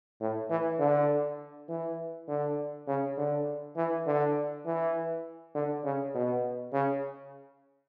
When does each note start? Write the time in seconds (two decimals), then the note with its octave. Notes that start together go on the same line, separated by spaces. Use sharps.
0.21 A2
0.50 E3
0.79 D3
1.69 E3
2.28 D3
2.87 C#3
3.17 D3
3.77 E3
4.06 D3
4.66 E3
5.55 D3
5.84 C#3
6.15 B2
6.73 C#3